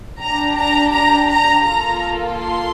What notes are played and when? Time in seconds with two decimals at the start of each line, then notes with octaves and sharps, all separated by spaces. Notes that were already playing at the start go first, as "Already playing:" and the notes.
0.21 D4 G4 A#5
0.58 A#5
0.93 A#5
1.29 A#5
1.66 A#3 F4 A4 A#5
2.38 C6